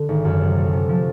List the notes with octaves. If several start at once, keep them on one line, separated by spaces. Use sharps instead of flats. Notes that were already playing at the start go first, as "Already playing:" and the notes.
Already playing: D3
G#1
F#2
C3
A3
C3
F3